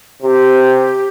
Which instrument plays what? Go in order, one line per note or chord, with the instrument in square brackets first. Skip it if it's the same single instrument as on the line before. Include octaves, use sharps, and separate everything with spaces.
[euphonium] C3 [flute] G4